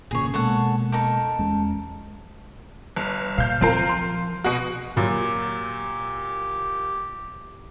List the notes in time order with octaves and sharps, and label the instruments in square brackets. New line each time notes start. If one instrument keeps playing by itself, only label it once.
[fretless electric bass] G#1 A#2 C#3 [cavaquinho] G#4 C#5
[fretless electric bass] B2 G#3 A#3 [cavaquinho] A4 C#5 F#5
[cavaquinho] D#4 A4 A#4
[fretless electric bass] E2 G#3 C#4
[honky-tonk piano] G1
[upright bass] A#2 [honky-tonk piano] F5 G6
[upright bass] F3 [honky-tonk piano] C4 F4 A#4
[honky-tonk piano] C6
B2 F#4
[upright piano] A#2 F#3 [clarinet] G4